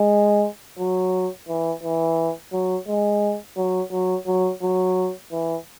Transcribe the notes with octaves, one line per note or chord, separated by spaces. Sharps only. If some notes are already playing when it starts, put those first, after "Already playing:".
Already playing: G#3
F#3
E3
E3
F#3
G#3
F#3
F#3
F#3
F#3
E3